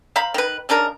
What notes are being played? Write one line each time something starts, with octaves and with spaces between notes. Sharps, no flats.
C5 F5 A#5 B5
D#3 B4
C#3 D4 D#4 A#4